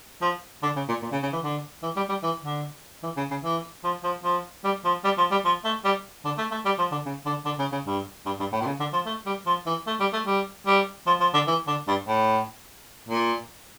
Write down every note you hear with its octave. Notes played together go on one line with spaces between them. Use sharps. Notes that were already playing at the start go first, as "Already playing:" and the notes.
F3
D3
C#3
A#2
A#2
C#3
C#3
E3
D3
E3
G3
G3
E3
D3
E3
C#3
C#3
E3
F3
F3
F3
G3
F3
G3
F3
G3
F3
A3
G3
D3
A3
A3
G3
F3
D3
C#3
D3
D3
C#3
C#3
G2
G2
G2
A2
A#2
C#3
D3
F3
A3
G3
F3
E3
A3
G3
A3
G3
G3
F3
F3
D3
E3
D3
G2
A2
A#2